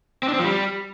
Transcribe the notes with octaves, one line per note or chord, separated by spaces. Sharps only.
C4
D4
C4
F3
G3